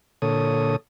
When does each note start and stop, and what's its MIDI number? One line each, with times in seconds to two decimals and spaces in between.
0.22 0.76 46
0.22 0.76 50
0.22 0.76 69
0.22 0.76 73
0.22 0.76 87